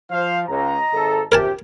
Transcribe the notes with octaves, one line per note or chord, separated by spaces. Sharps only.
F3 C5 F5
C#2 D#5 A#5
G#1 A4
A#1 C3 G4 A#4 G#5 A5